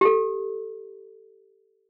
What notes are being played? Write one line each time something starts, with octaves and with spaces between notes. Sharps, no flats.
G4 A4